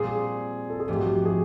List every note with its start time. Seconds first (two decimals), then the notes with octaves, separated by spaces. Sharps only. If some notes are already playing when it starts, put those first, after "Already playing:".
Already playing: A#2 G3 C4 G#4
0.70 A4
0.80 G#4
0.88 G#2 F3 A3 G4
1.01 F#4
1.13 G4
1.25 G#4